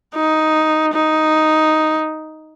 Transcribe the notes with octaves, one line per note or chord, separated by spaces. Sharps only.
D#4
D#4